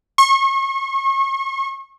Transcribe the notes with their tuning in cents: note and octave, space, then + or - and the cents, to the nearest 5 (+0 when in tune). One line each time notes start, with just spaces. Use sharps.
C#6 -35